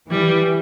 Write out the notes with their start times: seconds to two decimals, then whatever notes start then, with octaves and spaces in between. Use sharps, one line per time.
0.10 E3 G3